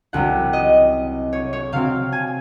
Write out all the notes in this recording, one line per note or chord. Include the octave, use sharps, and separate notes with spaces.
C2 C3 F#3 F#5
D#5
C#5
C#5
C3 F#3 C4 F5
G#5